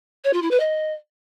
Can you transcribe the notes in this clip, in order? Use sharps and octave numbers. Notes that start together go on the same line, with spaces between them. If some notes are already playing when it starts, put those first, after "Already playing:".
C#5
F4
E4
B4
D#5